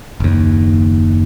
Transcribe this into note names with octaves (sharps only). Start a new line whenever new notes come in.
F#1 D#2